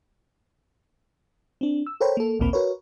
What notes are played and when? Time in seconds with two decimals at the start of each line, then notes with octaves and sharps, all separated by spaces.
1.61 C4 D4
1.87 E6
2.00 A4 A#4 C5 C#5 G5 B5
2.17 A#3 A4
2.39 A1 D2 A#2 A#3 C4 B5
2.53 F#4 A#4 B4 C#5